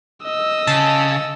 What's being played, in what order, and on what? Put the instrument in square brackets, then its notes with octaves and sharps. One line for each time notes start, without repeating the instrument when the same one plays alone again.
[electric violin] D#5 E6
[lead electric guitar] C#3 [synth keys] A5